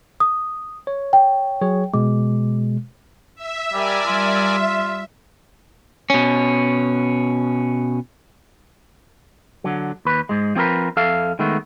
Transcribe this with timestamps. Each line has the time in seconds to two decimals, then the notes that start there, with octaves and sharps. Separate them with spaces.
0.20 D#6
0.87 C#5
1.13 G5
1.61 F#3 G#4 C#5
1.94 B2 G#3 D6
3.35 E5
3.74 G3 A#4 D5 G#5
4.07 G3 F4
6.10 B2 C#4
9.64 D3 F#3
10.05 D#2 B4
10.29 G#2 G#3
10.55 F3 C4 G#4 A#4 B4
10.97 F2 A4 E5 F5
11.39 D#3 G#3 A3 B3